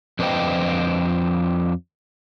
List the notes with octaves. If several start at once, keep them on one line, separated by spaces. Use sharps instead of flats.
F2 D4 B4 C5 D#5 G5